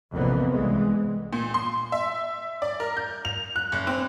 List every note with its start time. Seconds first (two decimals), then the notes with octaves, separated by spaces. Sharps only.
0.13 A#1 F2 C3 E3 A#3 B3
0.51 C2 E3 G#3
1.33 A#2
1.54 C6
1.92 E5
2.62 D5
2.80 A#4
2.97 G6
3.25 F7
3.56 F#6
3.72 F#1
3.87 C4